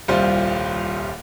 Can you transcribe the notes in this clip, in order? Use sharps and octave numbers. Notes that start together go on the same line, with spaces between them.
D#1 C2 G3 F4 C5